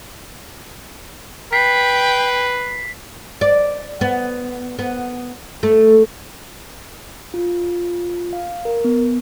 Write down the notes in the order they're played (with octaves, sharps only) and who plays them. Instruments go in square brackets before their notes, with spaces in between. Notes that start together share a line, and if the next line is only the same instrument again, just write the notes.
[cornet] B4 [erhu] G5 [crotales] B6 C7
[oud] D5
B3
B3
A3
[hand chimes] F4
F5
A#4
B3